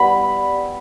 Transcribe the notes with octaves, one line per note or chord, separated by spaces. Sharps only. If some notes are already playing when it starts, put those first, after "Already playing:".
Already playing: G3 B3 E4 B5